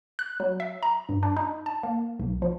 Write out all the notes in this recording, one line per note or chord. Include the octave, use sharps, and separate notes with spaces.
F#6
F#3
E5
A#5
G2
D4
D#4
A5
A#3
B1
F3